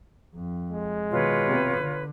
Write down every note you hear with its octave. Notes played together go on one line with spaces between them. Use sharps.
F2
G#3
B2 D#3 F4 B4 C#5
C3 B3
D3